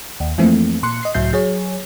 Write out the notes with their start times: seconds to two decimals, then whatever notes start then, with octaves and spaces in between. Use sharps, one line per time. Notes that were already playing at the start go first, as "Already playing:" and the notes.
0.20 D#2
0.38 F2 E3 F3 A3 A#3 C4
0.83 A#2 C6 F#6 C#7
1.03 D#5 C7
1.14 C#2 A2 F#3 E5 G6 C7
1.33 F#3 G#4 C#5